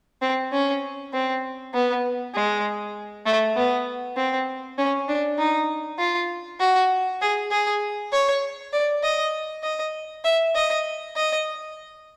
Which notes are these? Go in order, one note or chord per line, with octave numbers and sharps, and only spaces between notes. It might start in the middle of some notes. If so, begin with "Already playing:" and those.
C4
C#4
C4
B3
G#3
A3
B3
C4
C#4
D4
D#4
F4
F#4
G#4
G#4
C#5
D5
D#5
D#5
E5
D#5
D#5